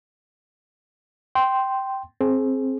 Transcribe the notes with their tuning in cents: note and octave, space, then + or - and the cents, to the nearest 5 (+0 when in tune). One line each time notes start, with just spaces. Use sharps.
G5 -10 C6 +0
C4 +15 G#4 +30